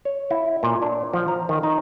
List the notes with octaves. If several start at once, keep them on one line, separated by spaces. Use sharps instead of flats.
C#5
E4
A#2
D4
F3
A#5
D#3
D#4